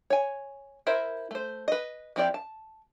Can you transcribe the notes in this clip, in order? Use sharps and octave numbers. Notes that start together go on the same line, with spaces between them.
C#5 G#5
E4 A#4 C5 E5
A3 C5
B4 D#5
F3 C4 E4 G4 D5
A5